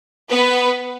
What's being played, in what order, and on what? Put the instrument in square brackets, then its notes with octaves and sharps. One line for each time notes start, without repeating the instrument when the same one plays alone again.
[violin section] B3 B4